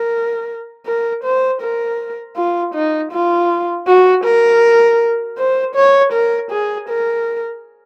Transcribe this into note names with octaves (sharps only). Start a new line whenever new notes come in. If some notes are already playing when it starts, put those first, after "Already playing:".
Already playing: A#4
A#4
C5
A#4
F4
D#4
F4
F#4
A#4
C5
C#5
A#4
G#4
A#4